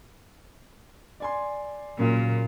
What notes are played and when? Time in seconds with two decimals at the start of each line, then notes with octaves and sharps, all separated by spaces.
1.20 D5 G#5 C6
1.99 A#2 C#3 F#3 A#3